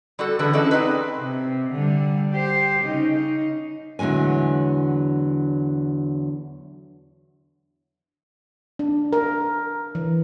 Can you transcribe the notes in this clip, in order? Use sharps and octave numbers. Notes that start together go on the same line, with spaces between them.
G3 F#4 A4
D3 E3 G#4 B4 A5
C#4 D4 E4 F#4 A4 D#5
C4 D#4 G#4 B4
C3
D3 G3
G4 C5
C#3 D#4
D#4
E2 D3 F#3 G#3 G#5
D4
A#4
E3